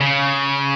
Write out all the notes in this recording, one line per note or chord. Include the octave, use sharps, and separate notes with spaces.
C#3